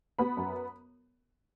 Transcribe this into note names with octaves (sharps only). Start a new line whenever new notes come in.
B3 B5
F#2